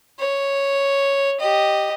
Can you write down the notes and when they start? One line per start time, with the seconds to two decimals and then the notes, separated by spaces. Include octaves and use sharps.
0.19 C#5
1.40 G4 D#5